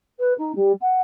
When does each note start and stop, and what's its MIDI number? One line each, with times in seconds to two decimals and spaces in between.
0.19 0.33 71
0.38 0.55 63
0.55 0.72 55
0.81 1.02 78